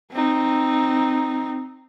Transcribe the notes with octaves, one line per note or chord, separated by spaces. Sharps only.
C4 D#4